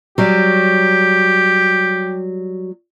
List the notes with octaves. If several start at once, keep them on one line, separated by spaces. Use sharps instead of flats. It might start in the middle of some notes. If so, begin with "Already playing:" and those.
F#3 G3 G4